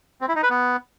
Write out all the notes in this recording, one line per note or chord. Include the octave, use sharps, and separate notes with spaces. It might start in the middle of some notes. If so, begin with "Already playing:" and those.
C4
E4
D#4
B4
B3